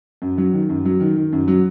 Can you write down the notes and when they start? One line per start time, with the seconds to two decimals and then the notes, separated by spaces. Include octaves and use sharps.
0.22 F#2
0.38 F#3
0.53 D#3
0.70 F#2
0.85 F#3
1.00 D#3
1.16 D#3
1.33 F#2
1.48 F#3